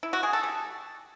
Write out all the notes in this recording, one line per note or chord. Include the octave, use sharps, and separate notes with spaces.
E4
F#4
G#4
A4
G3